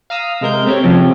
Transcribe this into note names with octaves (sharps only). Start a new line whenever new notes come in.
F5 A#5 D#6 E6
C3 G#3 A#4 G6
A3 C4 G4 C#5
C3 F3 C4 C#4